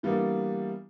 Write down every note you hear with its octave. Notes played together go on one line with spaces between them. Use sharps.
E3 G3 A#3 B3 D4